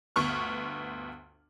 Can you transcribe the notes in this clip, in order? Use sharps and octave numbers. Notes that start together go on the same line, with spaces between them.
G1 D2 B3 C#6 F6